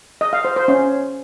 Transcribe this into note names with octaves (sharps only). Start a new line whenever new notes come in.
D#5
F5
C5
C5
C#4